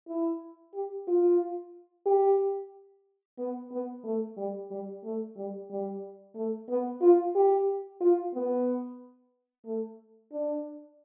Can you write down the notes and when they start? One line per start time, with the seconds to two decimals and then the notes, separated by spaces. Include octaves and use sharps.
0.08 E4
0.74 G4
1.08 F4
2.06 G4
3.38 B3
3.72 B3
4.04 A3
4.37 G3
4.71 G3
5.04 A3
5.37 G3
5.70 G3
6.35 A3
6.69 B3
7.01 F4
7.35 G4
8.01 F4
8.35 B3
9.65 A3
10.32 D4